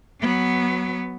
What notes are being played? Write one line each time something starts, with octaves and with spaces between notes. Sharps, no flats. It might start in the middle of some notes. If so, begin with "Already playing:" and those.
F#3 B3